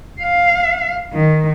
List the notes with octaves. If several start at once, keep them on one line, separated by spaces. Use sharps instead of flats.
F5
D#3